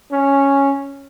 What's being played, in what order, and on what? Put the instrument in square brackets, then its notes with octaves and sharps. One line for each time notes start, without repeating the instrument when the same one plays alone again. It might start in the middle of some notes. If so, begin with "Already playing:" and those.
[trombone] C#4